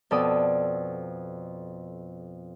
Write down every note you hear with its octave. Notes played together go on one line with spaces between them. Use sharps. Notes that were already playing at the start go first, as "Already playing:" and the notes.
F2 B2 A4 D5 D#6